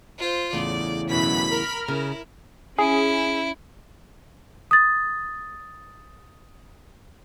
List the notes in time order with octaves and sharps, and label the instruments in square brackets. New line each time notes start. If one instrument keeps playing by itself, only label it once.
[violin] F4 C5
[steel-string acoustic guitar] E2 A2 C#3 [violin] D5
[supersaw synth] F#2 B2 E3 [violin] B5 B6
[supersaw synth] A#4 F6
[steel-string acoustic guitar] C#3 [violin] E4
[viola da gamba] C#4 [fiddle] E4 [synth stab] G#4
[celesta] D#6 A6